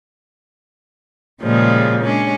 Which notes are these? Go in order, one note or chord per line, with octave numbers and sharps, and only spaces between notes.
A#2 C#3 F3 G3 G#3
G#3 C#4 D4